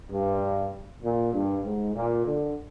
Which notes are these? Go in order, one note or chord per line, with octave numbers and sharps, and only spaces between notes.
G2
A#2
G2
G#2
A#2
D3